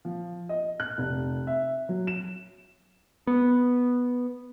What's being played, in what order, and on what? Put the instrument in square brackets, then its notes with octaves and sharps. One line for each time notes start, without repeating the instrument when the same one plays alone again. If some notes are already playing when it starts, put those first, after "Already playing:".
[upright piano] F3
D#5
F#6
F1
E5
F#3
E7
[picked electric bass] B3